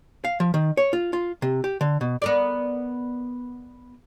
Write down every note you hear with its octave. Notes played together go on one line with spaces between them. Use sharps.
F5
F3
D#3
C#5
F4
F4
C3
G4
D3
B2
B3 A#4 D5